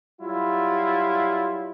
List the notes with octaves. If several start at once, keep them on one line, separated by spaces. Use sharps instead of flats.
F#3 G3 E4 F4